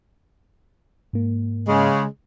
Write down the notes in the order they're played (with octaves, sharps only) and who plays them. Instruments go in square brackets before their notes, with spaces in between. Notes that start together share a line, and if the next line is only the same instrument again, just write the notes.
[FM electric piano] G#2 A#3
[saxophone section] C#3 G#3